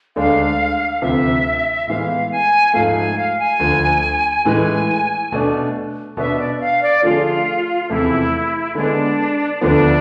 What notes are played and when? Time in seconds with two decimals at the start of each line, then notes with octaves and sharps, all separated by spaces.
0.16 D2 D3 G#3 D4 F5
1.02 D2 C3 F3 E5
1.87 A2 E3 G#3 B3 F5
2.30 G#5
2.74 G#2 F3 A3 F5
2.95 G#5
3.17 F5
3.39 G#5
3.60 D2 D3 F3
4.45 A2 E3 G#3 G#5
5.32 B2 A3 D4
6.17 B2 B3 D4 E5
6.39 D5
6.60 F5
6.82 D5
7.03 D3 F3 A3 D4 F4 G#4
7.89 E2 C3 F3 A3 E4
8.75 D3 G#3 B3 D4
9.61 D2 D3 F3 B3 D4